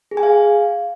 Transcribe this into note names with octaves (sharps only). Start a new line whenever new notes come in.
G#4
G#5
F5